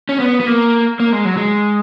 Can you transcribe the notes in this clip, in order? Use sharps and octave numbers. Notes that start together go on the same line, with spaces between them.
C#4
B3
B3
A#3
A#3
G#3
F#3
G#3